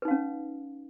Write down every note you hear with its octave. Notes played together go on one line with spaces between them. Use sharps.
C#4 D#4 B4 F5